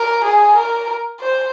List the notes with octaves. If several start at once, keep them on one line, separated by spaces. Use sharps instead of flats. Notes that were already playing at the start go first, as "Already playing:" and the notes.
Already playing: A#4
G#4
A#4
C5